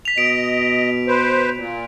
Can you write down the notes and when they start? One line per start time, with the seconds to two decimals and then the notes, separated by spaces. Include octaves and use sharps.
0.05 B6 F7
0.18 B2 D#5 D7
1.08 B4 C5
1.56 A#2